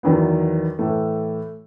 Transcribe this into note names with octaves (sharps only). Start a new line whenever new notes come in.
E2 D#3 F#3 B3
A2 E3 A3